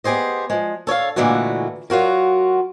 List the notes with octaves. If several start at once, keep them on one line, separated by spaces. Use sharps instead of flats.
B3 G4 G#4 C5 D#5
F3 G#3
A4 C#5 D5 F5
A#2 D3 E3 G#3 A3 F#4
F#3 F4 F#4 A#4